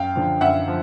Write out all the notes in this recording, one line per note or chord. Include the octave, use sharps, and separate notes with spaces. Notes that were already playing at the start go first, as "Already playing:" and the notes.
Already playing: F#2 F5 G5
D3 F3
F#2 E5 F#5
F3